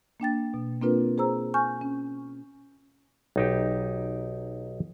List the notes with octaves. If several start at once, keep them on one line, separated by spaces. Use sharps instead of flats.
A#3 D4 G5 A6
B2
A#3 C4 D4 F4 A#4 B4
G#4 C5 A#5 E6
G#5 C#6 F6 G6
C#4
B1 D#4 G4